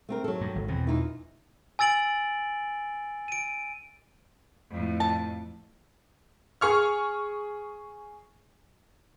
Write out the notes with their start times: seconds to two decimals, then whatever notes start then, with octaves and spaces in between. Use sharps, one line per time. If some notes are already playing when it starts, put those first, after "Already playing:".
0.09 A3 C4 A#4
0.24 F#3 A4
0.41 G2
0.55 G#1
0.68 E2 B2 C4
0.87 E3 D#4 F4
1.79 G#5 E6 A6 D7 F#7
3.28 D7 D#7
4.69 F2 A2
5.00 A5
6.61 G#4 C#6 F6